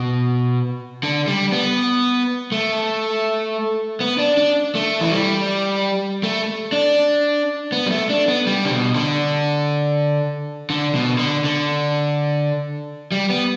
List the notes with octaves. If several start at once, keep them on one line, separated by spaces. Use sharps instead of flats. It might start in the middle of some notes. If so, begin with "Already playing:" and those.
Already playing: B2
D3
G3
B3
A3
B3
D4
D4
A3
E3
G3
A3
D4
B3
G3
A3
D4
B3
G3
D3
B2
D3
D3
B2
D3
D3
G3
B3